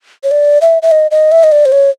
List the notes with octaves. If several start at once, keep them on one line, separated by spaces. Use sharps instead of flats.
C#5
D5
E5
E5
D#5
D#5
E5
D#5
D5
C5
C#5